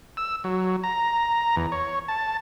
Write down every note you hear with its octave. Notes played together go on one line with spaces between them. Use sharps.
E6
F#3
A#5
E2
C#5
A5